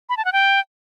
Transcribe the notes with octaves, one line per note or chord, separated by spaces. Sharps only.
B5
A5
F#5
G5